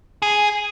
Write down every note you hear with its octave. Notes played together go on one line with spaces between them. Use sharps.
G#4